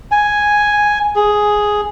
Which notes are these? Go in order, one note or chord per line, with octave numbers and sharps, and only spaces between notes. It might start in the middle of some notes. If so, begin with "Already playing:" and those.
G#5
G#4